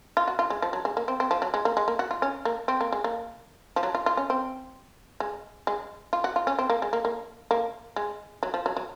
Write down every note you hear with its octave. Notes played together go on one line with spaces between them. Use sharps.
F4
F#4
F4
G#3
F3
F#3
G#3
A#3
C4
C4
F3
F#3
G#3
A#3
G#3
A#3
F#4
F4
C#4
A#3
C4
A#3
G#3
A#3
F3
F#3
F4
F4
C#4
C4
G#3
G#3
F4
F#4
F4
C#4
C4
A#3
G#3
A#3
A#3
A#3
G#3
F#3
F3
F#3
F#3